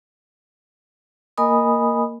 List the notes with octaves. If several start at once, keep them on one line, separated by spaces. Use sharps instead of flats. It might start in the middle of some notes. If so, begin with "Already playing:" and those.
A#3 A#4 D#5 G#5 B5 D#6